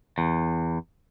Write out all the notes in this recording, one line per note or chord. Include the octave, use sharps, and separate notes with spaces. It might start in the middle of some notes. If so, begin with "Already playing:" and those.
E2